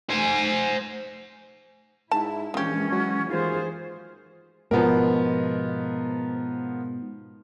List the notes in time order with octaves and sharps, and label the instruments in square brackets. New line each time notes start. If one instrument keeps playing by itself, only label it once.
[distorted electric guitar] C5 G#5
[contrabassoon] G#2 [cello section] E4 [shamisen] A5
[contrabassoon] A#1 [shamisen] C#3 G4 [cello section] E3 G#3 [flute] C#4
[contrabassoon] F#3
[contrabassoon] D#2 [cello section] E3 G#4 C5 [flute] F4
[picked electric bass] G#2 B2 [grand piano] F3 B3 A#4